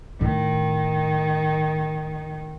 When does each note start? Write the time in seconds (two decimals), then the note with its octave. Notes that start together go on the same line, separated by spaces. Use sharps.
0.21 A2 D#3